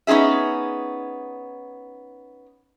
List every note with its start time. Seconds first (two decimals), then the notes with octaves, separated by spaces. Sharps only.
0.07 B3 C#4 D#4 G#4 E5